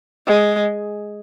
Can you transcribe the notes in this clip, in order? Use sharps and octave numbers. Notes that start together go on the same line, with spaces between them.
G#3